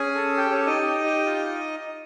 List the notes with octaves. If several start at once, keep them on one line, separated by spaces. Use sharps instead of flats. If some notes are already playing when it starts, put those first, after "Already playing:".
Already playing: C#4 G#4 G#5
A4
G4 G5
C#4 C#5
G4
D#4 D#5
G4
G4
F4